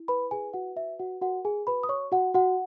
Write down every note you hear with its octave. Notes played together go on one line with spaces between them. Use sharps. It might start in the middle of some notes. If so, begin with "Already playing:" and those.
Already playing: E4
B4 B5
G#4 B4 G#5
F#4 F#5
F#4 E5
F#4 F#5
F#4 A#4 F#5
G#4 G#5
F#4 B4 B5
D#6
C#5 C#6
F#4 F#5
F#4 F#5